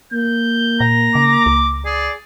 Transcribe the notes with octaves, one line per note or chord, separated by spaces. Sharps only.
A#3 G6
A#2 A#5
C#3 D6
C#2
G#4 D5